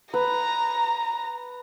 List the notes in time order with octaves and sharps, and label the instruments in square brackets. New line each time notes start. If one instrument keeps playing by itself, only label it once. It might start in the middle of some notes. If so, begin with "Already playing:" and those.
[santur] B4 [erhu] A#5